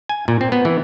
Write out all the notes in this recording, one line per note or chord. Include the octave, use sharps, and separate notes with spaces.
G#5
A#2
C4
B3
E3